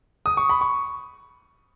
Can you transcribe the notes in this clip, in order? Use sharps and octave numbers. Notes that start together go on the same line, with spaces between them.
D#6
C#6
B5
C#6